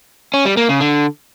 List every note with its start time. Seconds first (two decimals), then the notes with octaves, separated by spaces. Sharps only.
0.34 C#4
0.45 G3
0.57 A#3
0.69 C#3
0.81 D3